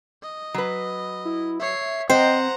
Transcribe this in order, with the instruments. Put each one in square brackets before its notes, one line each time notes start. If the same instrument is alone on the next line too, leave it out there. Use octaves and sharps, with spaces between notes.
[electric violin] D#5
[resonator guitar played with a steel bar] F#3 B4
[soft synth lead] E4
[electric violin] C#5 C7 [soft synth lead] E5
[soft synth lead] C4 [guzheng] C5 [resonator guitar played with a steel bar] D#5 G5 [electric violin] F#5 A#5